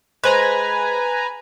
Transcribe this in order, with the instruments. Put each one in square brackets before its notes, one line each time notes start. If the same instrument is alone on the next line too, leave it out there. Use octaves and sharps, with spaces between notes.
[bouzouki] G#3 C5 [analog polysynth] B4 G#5 A#5